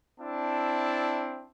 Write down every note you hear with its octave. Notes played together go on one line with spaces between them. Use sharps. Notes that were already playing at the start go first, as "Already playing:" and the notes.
C4 D4 E4 A5